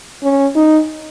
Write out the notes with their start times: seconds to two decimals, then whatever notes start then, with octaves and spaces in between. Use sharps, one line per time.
0.23 C#4
0.56 D#4